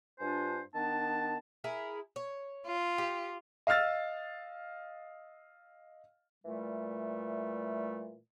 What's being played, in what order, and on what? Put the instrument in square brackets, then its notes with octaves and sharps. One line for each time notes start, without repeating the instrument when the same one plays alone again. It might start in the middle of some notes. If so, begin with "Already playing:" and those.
[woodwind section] G2 D4 F4 C5 G#5
D#3 B3 D4 A5
[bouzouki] E4 G#4 A#4
C#5
[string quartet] F4
[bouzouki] G4
[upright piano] D#5 F5 E6 F6 A6
[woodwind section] A#2 E3 G3 A3